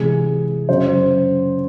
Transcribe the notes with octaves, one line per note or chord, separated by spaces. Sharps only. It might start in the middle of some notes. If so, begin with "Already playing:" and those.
Already playing: C3 E3 G#3 G#4
F#2 C#3 F#3 C5